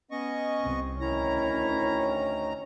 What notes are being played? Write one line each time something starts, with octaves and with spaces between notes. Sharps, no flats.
B3 C#4 D#5 C#6
C2 C4
D2 D#3 C#4 E4 A#5